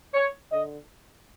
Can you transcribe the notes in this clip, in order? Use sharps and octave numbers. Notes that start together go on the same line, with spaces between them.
C#5
D3 D#5